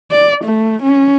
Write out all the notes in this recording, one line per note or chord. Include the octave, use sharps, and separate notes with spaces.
D5
A3
C#4